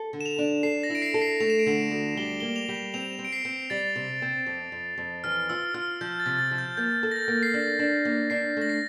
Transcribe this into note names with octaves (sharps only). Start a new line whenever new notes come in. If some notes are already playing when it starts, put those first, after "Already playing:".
Already playing: A4
D3
E7
F7
D4
A4 C7
A#6
E4
D7
C7
A4
C7
A3 F7
E7
D7
D3 E7
D2
G3 G7
A#3 G7
F7
G3
C4 F7
C4
D7
C7
C4
G3 A6
C3
C4
F2
F2
F2
E3 F6
F4 E6
F4 F6
F3 G6
A6
C3
A6
F3
G6
A#3 G6
A4
A#6
A6
A#3
C7
D4 A#6
D4
A#3
D4 C7
A3 A#6
C7